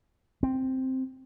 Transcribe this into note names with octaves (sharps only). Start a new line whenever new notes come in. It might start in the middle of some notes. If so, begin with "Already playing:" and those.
C4